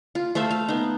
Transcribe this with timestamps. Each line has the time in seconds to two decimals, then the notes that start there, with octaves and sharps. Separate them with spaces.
0.15 F4
0.35 A3 C5 E5 F5
0.51 F5
0.69 B3 D#4